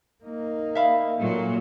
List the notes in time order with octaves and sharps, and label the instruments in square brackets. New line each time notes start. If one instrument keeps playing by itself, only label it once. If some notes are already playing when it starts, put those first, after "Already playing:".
[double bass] A#3 D#4
[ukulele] E5 F5 B5
[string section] A#2 F#3 [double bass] A3